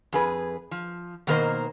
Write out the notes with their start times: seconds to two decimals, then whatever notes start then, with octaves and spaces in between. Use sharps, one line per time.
0.13 F2 G#4 B4
0.71 F3
1.27 B2 D#3 A#3 A#4 C5 D#5